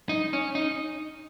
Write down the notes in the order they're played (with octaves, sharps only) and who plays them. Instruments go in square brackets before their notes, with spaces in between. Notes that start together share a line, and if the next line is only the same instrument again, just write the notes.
[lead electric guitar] D#4
C#4
D#4